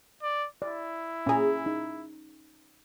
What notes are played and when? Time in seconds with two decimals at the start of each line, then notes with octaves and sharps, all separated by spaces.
0.22 D5
0.62 E4 D5
1.26 A#2 C#4 G#4 A#5
1.66 D#4